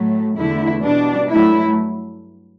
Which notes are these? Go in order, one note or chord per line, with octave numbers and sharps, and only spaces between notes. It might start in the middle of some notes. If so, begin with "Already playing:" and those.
Already playing: A2 F#3 A3
E2 D3 A3 E4
B2 G3 D4
G2 F#3 A3 E4